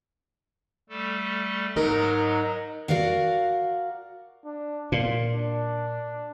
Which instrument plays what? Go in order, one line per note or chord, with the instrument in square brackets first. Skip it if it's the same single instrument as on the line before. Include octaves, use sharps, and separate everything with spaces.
[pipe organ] G3 A3 A4
[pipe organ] G#2 F#3 [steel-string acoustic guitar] D#4 A#4
[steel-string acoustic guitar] F#4 A#4 D5 F5 F#5
[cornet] D4
[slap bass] A#2 [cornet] F4
[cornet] D4